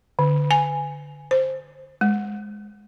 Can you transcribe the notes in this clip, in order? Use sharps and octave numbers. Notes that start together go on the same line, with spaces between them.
D3
G#5
C5
G#3